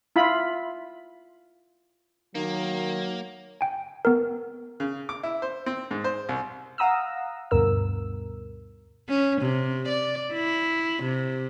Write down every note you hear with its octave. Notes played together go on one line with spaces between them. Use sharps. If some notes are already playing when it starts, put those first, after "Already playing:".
E4 F4 B5
D#3 F#3 A#3
G5 G#5
B3 A#4
C#3
D6
E4
C5
C4
G#2
C5
C2
F5 F#5 A#5 D#6 E6
D2 G2 B2 A#4 E6
C#4
C3
D5
E4
C3